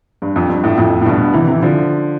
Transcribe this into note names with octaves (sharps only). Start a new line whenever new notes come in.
G2
F2
G2
F2 A2
F2 A2
A2
G2 B2
C3 E3
C3 E3
D3 F3